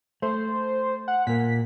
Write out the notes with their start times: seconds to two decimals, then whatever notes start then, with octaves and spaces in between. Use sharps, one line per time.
0.22 A3 C5
1.08 F#5
1.27 A#2 A#3 B6